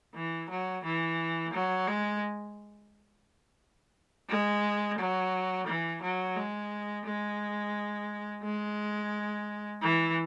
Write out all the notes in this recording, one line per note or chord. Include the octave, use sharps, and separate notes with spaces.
E3
F#3
E3
F#3
G#3
G#3
F#3
E3
F#3
G#3
G#3
G#3
E3